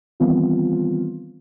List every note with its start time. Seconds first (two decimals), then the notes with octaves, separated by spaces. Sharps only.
0.20 D#3 E3 G3 B3 C4 F4